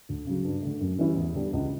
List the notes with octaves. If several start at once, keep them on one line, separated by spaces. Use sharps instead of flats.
D2
C#3 F#3
G2
D3 A3
F#2
E3 G3 C#4 E4
E2
D3 G3 B3 D4
C#2